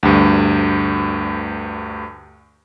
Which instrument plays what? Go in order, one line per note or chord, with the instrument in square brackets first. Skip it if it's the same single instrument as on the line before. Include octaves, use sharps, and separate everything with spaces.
[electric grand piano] D2 G2